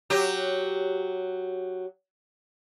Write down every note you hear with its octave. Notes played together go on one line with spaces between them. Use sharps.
F#3 G4